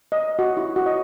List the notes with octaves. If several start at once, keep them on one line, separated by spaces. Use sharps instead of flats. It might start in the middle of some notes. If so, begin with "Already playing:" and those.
D#5
F#4
E4
F#4
D#5